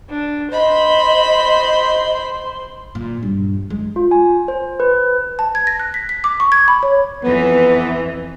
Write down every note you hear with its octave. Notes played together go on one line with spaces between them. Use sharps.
D4
C5 D#5 B5 C6
A#2
G2
G#3
F4
G#5
C5
B4
A5
G#6
A#6
F#6
B6
B6
D6
C#6
G#6
B5
C#5
F2 E3 B3